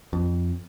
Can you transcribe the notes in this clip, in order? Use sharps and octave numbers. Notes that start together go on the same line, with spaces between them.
F2